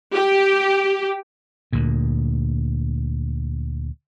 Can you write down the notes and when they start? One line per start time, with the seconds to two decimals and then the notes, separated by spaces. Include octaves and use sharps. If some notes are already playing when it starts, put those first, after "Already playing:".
0.13 G4
1.73 D2 A#2